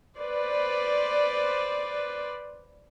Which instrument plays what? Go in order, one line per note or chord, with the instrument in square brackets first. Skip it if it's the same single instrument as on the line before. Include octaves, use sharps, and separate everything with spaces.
[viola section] B4 C5 D5